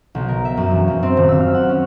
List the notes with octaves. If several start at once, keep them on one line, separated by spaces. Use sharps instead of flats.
B1
A#4
E5
F#2
E1
F#2
C4
D#1
E6
F6
F#5
C#4